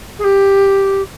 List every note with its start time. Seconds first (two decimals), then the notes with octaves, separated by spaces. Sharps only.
0.19 G#4
0.24 G4